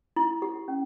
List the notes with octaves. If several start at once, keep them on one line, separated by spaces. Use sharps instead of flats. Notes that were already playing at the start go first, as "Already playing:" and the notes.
E4
G4
C#4